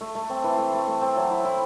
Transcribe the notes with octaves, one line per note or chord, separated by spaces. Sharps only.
A3
A3
C4
E3
A3
A3
A3
C4
F#3
E4
E4